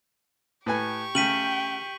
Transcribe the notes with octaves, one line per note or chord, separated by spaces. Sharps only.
A2 G4 B4 G#5 C#6
C#3 A3 G5 B6 D#7 F#7